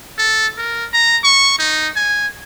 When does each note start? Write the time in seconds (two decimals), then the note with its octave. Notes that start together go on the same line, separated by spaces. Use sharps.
0.18 A4
0.57 A#4
0.94 A#5
1.24 C#6
1.59 D#4
1.96 G#5